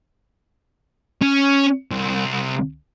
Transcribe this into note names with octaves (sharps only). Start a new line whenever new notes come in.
C#4
C2